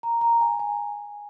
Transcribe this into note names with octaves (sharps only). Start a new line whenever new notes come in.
A#5
A#5
G#5
G#5